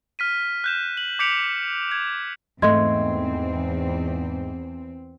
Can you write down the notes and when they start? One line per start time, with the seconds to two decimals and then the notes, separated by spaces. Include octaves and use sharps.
0.19 F6 B6 D#7
0.64 F#6 G6 E7
0.97 F#7
1.19 D6 G6 B6 C#7 D7 F7
1.92 G#6
2.62 E2 G#2 A3 C4 D#5 C6 G#6